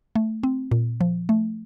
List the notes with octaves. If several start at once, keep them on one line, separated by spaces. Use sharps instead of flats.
A3
C4
A#2
F3
A3